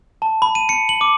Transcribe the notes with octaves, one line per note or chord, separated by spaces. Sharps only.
A5
B5
D#7
C#7
F#7
D6